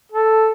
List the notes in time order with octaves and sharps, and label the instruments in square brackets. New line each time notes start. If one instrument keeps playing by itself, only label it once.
[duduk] A4